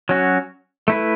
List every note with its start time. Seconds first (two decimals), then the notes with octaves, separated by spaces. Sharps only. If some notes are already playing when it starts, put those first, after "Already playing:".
0.09 F#3 C#4 F#4
0.88 A3 E4 B4